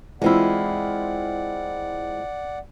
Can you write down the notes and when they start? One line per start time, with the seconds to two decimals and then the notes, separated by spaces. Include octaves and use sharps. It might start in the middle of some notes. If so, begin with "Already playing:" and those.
0.22 E3 G#3 C4 E4 F4 D5 F#5